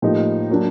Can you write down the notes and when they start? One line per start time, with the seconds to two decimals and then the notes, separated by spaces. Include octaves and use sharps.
0.02 A2 F3 A#3 D#4 G4
0.50 F#3 A#3 D4